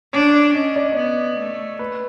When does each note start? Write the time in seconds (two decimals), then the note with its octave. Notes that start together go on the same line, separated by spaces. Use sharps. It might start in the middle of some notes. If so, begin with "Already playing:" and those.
0.13 D4 C#5
0.34 D5
0.54 C#4 D#5
0.76 D5
0.83 D#5
0.92 B3 D5
1.38 A3
1.79 B4